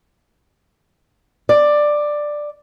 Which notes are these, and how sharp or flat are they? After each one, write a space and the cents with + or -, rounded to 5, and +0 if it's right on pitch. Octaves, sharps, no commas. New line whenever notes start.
D5 +10